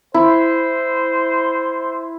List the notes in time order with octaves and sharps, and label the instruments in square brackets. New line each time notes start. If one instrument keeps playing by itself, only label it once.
[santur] E4 [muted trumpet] C5